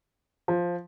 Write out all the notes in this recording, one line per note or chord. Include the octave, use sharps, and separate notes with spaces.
F3